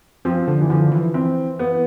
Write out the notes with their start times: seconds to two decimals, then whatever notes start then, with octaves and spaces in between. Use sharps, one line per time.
0.25 F3 C4
0.48 D3
0.61 E3
0.70 D3 F3
0.92 E3
1.14 C4
1.59 B3